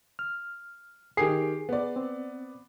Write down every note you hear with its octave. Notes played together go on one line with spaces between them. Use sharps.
F6
D#3 G4 G#4 C7
B3 D5
C4